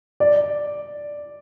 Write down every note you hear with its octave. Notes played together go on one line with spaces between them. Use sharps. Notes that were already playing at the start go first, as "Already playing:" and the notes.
D5